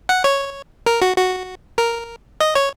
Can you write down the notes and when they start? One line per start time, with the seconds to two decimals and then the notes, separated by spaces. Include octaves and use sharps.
0.09 F#5
0.24 C#5
0.86 A#4
1.02 F#4
1.17 F#4
1.78 A#4
2.40 D#5
2.55 C#5